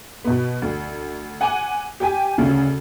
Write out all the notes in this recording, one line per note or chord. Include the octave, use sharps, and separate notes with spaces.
B2 B3
D2
F#5 G#5 D6
G4 G5 G#5
D2 C#3